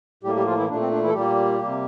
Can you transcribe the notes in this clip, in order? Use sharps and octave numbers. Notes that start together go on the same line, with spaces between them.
A2 G3 A#3 G4
G3 G4
F3 F4
E3 E4
A#2 A3 D4
C4
D4
E3 E4
A4
A#2 G3 A#3 G4
C3 G3 A#3